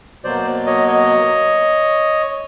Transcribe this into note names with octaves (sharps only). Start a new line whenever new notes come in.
B2 F#3 A#3 C5 D5
C#5 D#5
C#5 D#5